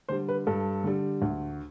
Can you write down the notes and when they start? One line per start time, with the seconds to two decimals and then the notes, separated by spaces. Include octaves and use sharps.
0.09 D3 G3 C5
0.29 B4
0.47 G2 A4
0.84 D3 G3
1.22 D2